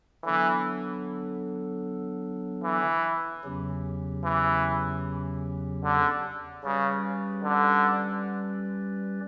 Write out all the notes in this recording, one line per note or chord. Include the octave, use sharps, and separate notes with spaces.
D3 E3 F#3 B3 D4 A4
E3
E2 C#3 F#3 C#4 G4
E3
D3
C#3 G3 C#4 G4 B4 D5
D3